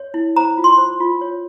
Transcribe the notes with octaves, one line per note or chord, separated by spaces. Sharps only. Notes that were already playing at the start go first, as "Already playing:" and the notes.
Already playing: C#5
E4
C5 A#5
F4
C6
C5
F4
C#5